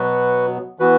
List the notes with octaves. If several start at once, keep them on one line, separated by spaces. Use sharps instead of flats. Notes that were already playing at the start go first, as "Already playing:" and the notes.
Already playing: B2 F#3 B3 F#4 B4
E3 B3 F#4 B4